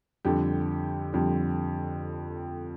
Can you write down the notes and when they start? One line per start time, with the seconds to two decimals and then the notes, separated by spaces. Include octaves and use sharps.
0.25 F2 D3 G3 G4
1.13 F2 D3 G3